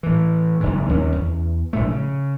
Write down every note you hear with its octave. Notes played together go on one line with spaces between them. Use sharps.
A2 E3
F#1 G#2
D#2 A#3 C#4
E2
A#1 A2 A3
C#3